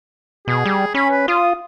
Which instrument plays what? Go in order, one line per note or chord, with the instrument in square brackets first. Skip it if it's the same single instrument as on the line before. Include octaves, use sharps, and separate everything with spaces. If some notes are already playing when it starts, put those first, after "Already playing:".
[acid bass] B2 [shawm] G#4
[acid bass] G3
[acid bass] C#4 [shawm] B5
[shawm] B4
[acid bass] F4 [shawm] D#6